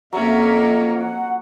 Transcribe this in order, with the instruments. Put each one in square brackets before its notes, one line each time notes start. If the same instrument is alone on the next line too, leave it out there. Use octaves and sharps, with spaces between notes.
[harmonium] F2 [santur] F#3 [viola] A#3 C#4 [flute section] E5
[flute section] F#5